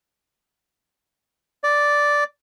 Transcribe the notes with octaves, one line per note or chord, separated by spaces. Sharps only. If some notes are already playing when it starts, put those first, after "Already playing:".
D5